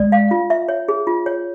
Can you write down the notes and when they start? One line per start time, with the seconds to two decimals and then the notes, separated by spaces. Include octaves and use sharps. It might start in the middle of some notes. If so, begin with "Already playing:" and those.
Already playing: G#3 D5
0.12 F5
0.31 F4
0.50 E5
0.68 C#5
0.88 G#4
1.07 F4
1.26 C#5